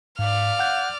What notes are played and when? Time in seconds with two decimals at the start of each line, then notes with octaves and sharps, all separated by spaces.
0.19 G#2 D5 F5 F6
0.59 F#5 F#6 G6